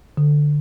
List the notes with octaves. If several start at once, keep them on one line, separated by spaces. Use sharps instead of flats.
D3